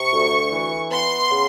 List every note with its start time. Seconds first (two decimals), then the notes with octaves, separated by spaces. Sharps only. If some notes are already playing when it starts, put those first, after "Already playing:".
Already playing: C3 C#6
0.13 D2
0.51 E3
0.90 B3 C6
1.30 C#3